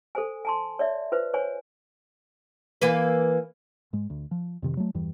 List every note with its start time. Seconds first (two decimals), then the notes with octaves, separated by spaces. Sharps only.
0.15 A4 C5 G#5
0.45 G#5 A5 C6
0.79 C#5 D5 E5
1.12 F4 B4 C5
1.34 C5 C#5 G#5
2.82 E3 A#3 B4
3.93 G#2 G#3
4.10 D2
4.31 F3
4.62 F2 C3 D#3
4.77 F#3 A3
4.95 E2 G2 E3